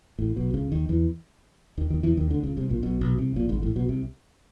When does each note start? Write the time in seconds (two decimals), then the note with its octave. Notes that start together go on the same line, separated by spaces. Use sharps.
0.19 A1 A2
0.36 B1 B2
0.54 C#2 C#3
0.72 D#2 D#3
0.89 E2 E3
1.78 D#2 D#3
1.90 D#2 D#3
2.03 E2 E3
2.17 D#2 D#3
2.30 D2 D3
2.43 C#2 C#3
2.57 C2 C3
2.69 A#1 A#2
2.83 B1 B2
3.01 B1 B2
3.18 C2 C3
3.36 A#1 A#2
3.49 G#1 G#2
3.62 A1 A2
3.75 B1 B2
3.88 C2 C3